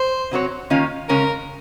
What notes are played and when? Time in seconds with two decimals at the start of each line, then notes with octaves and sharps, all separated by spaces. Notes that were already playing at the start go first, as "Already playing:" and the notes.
Already playing: C5
0.31 C3 F#3 C4 F#4 C#5
0.70 D#3 A#3 C#4 F4
1.09 C#3 G#3 C#4 A#4